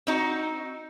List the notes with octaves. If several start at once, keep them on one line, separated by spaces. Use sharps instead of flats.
C4 D#4 F#4